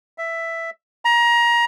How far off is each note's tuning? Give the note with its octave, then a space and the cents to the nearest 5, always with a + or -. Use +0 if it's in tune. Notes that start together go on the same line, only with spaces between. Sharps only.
E5 +5
A#5 +25